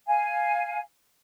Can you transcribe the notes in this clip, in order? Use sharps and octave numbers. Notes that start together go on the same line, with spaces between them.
F5 G#5